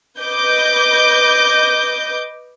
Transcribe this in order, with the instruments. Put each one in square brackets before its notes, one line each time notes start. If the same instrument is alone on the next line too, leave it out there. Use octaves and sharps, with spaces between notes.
[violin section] B4 D#5 D6 G6